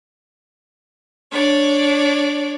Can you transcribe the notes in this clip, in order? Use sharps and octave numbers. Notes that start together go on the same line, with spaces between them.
D4 C#5 D5